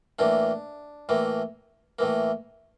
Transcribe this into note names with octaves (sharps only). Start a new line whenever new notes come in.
A2 E3 A#3 D4
A2 E3 A#3
A2 E3 A#3